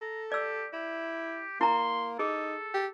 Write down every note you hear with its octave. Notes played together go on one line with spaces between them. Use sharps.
A4 A#5
G4 D5 E6
E4 G4
A#3 E4 A#5 C6
D#4 G#4 A4
G4